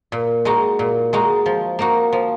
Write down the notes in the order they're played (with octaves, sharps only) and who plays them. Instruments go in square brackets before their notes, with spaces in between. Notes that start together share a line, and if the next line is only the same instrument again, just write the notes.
[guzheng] A#2
G#3 D#4 F#4
A#2
G#3 D#4 F#4
F3
A#3 D#4 F#4
F3